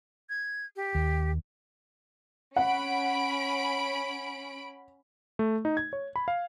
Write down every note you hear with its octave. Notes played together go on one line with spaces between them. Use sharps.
G#6
G4
D#2
C#4 F#5 B5 D7
A3
D#4
G#6
C#5
B5
F5